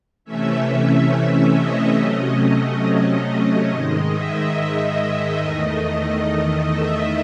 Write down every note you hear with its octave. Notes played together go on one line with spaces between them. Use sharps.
C3 E3 A3 C#4 E5
D#5
C3 F#3 A3 C#4
D#5
G#2 D#3 G#3
E5
E2 D#3 A3 D#5
E5